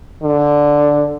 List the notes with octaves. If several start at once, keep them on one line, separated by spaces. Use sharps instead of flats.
D3